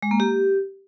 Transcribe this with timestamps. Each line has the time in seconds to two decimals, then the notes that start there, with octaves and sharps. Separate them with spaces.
0.03 G#3
0.11 A#3
0.20 G4